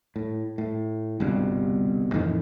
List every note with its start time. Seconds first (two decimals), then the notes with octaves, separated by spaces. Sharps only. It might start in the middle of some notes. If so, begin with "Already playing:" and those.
0.16 A2
0.58 A2
1.20 G1 C2 G2 B2
2.14 F2 A2 D#3 E3